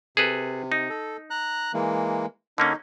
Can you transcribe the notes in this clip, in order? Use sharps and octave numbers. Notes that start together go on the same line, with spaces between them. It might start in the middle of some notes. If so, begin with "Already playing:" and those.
C3 G#4 A4 B4
D#4
A4
A#5 F#6
E3 G#3 A#3
D3 A#3 C#4 D#4